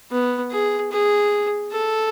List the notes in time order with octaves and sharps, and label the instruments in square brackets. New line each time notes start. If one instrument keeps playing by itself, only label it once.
[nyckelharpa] B3
G#4
G#4
A4